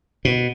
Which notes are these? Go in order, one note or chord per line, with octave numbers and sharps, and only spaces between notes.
B2